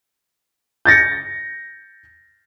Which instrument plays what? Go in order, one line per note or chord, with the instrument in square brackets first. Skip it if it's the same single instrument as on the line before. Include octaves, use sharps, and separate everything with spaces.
[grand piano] G6 A6 A#6 C#7